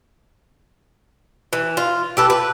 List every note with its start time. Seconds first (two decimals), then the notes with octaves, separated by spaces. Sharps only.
1.53 E3
1.77 F4
2.17 G4 A4 B4
2.30 B4